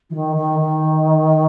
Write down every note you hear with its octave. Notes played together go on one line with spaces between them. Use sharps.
E3
D#3
D#3
D#3